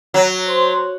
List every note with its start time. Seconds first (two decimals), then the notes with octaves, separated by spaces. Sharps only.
0.14 F#3
0.47 C5